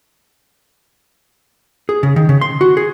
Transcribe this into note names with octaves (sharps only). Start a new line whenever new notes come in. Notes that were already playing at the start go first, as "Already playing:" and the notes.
G#4
C#3
D#3
C#3
C6
F#4
G#4